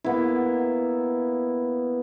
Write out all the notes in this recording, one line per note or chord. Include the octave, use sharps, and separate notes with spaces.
A#3 B3 E4